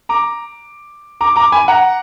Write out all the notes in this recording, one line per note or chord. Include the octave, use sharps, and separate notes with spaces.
A#5 D6
A#5 D6
A#5 D6
G#5 B5
F#5 A#5